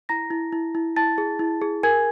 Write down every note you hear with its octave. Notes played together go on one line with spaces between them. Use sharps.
E4 A#5 A#6
E4
E4
E4
E4 A5 A6
G#4
E4
G#4
A#4 G#5 G#6